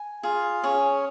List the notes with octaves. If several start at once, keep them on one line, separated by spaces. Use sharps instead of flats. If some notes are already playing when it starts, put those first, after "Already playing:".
Already playing: G#5
F4 G#4 F5
C#4 G#4 C#5